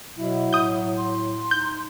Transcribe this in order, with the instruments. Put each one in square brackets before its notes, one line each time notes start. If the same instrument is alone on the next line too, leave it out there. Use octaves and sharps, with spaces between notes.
[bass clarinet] B2 [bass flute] F#3 [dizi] E4
[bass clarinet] A2 [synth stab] D#6 G6
[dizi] C6
[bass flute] D#4 [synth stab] G6